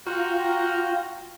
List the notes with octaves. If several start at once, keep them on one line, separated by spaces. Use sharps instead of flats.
F4 F#4 F5 G5 A#5